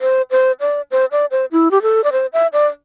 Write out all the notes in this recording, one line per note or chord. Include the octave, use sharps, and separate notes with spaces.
C5
C5
D5
C5
D5
C5
E4
G4
A4
D5
C5
E5
D5